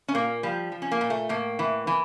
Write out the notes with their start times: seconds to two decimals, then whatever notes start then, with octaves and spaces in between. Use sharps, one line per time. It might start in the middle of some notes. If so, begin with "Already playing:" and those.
0.08 C#4
0.15 A#2 A#3
0.43 F3 G3
0.72 F3
0.82 C#4
0.91 A#3
1.01 A#2
1.10 A3
1.29 A2 A#3
1.59 E3
1.87 E3